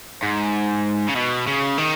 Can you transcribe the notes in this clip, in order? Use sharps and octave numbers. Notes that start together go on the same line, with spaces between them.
G#2
C#3
B2
C#3
D#3